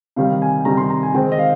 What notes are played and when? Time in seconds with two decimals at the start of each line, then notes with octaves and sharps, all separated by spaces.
0.16 C3 D#3 G3 F5
0.42 G#5
0.65 C3 D#3 G3 A#5
0.77 C6
0.90 A#5
1.03 G#5
1.14 D#3 G#3 C4 G5
1.32 D#5
1.39 F5